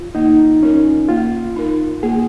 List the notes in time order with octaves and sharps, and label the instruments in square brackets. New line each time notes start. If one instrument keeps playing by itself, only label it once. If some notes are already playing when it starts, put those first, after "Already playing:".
Already playing: [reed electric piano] F4
[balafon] A#3 [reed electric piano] D#4
[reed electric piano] C#4 [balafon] D#4 A#4
[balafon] A#3 [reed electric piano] F4
[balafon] D#4 A#4
[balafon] A#3 [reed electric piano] G#4